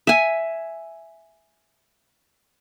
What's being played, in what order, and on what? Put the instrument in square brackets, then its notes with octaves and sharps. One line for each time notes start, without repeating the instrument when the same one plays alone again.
[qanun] E5 G#5